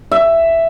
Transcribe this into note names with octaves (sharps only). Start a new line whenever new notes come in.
E5